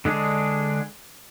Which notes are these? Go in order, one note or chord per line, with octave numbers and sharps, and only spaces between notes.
D3 G#3 D4 G#4